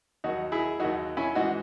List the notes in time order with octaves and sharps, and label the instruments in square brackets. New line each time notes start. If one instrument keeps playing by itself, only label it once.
[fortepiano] D#2 D#3 F#3 D#4 F#4
E4 G#4
D#2 D#3 F#3 D#4 F#4
C#4 E4
G#2 E3 D#4 F#4